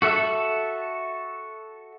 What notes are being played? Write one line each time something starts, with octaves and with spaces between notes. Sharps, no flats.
F#4 A4 E5